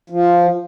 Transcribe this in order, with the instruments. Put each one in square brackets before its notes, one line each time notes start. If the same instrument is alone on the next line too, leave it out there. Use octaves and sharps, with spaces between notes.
[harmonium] F3